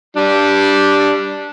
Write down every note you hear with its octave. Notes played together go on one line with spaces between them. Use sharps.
G3 D4